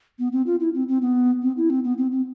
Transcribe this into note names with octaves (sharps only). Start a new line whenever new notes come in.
B3
C4
F4
E4
C4
C4
B3
C4
E4
C4
B3
C4
C4